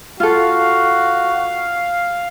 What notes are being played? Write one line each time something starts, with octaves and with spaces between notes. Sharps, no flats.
F4 F#4 A4 F5